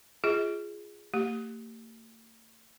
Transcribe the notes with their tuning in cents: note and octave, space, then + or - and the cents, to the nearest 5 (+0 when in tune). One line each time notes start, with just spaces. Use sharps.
F4 -10 G#4 +0 D#5 +40
A#3 -45 G4 +0